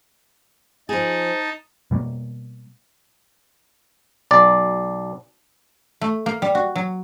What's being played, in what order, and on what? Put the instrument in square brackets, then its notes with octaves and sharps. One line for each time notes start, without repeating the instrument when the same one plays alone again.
[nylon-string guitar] F3 G#4 [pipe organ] D#4 A5
[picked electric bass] B2 G3 A3 A#3
[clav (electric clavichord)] B1 D5
[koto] A3
A#3
G3
F#4
F#3